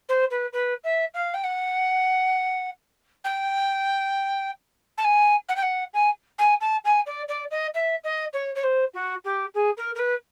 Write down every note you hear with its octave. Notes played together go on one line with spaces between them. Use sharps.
C5
B4
B4
E5
F5
G5
F#5
G5
A5
G#5
F#5
G5
F#5
G#5
G#5
A5
G#5
D5
D5
D#5
E5
D#5
C#5
C#5
C5
F#4
G4
G#4
A#4
A#4
B4